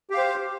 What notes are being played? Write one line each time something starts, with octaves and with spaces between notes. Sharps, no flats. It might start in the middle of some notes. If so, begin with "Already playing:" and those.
G4 C5 F5